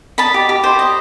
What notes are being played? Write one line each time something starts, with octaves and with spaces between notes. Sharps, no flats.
D#5 A5 B5
G4
G4
C5
D#5